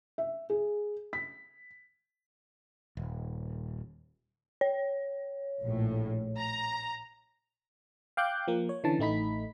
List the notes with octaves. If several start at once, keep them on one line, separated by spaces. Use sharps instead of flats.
E5
G#4
B6
D#1
C#5
A#1 A2
A#5
F5 G5 D6 F#6 G6
F3 A#3
C#5
D3 E3 C#4 A5
A1 A3 D#4 B5 B6